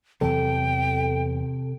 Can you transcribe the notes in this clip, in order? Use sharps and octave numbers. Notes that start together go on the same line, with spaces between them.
E2 C3 E3 F#3 A4 G5